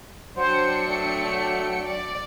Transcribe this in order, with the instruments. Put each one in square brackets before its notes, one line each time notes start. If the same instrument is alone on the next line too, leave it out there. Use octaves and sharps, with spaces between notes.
[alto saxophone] F#3 [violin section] D4 G5 C#7 [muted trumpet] C5
[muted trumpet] A3
[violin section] D5